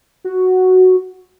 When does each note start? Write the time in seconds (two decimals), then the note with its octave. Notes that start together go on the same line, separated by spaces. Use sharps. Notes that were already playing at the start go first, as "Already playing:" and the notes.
0.24 F#4